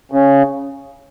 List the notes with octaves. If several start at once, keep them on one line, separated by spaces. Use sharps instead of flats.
C#3